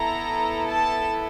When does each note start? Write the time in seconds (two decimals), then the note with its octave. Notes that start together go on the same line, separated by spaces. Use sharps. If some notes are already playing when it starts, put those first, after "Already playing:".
Already playing: B3 E4 A4 A#5
0.69 A5